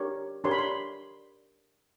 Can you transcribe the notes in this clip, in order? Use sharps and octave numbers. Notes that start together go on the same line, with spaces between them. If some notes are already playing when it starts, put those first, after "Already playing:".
Already playing: D4 G4 A#4 C#5
D4 G4 A#4 C#5 C6
B5
C6